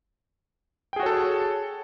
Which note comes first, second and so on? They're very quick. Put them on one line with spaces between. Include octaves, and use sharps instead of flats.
G5 G#4 F#4 C#5 A4